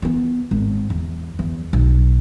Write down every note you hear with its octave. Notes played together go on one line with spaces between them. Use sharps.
E3 B3
G#1
E2
E2
B1